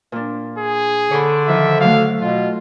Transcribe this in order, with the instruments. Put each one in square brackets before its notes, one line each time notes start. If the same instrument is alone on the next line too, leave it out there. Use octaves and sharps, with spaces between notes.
[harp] A#2 D4
[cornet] G#4
[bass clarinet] D3 [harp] C#5 B5 C6
[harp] D#3 F3 [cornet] E5
[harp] F#3 A3 [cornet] F5
[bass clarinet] B2 [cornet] F4